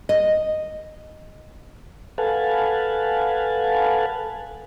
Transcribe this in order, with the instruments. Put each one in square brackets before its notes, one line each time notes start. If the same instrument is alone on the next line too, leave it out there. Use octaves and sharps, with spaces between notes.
[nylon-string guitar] D#5
[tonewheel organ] A4 B4 F5 F#5 G#5 A5